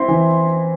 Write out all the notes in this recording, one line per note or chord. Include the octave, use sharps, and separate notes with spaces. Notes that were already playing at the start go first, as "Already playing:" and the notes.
Already playing: C4 E4 C6
E3